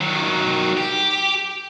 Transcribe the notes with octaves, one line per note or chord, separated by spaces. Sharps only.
D#3 F#3
G4